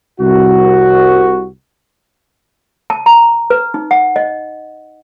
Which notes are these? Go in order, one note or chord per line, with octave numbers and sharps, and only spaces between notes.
C2 F#4
A5
A#5
B4
D#4
F#5
D#5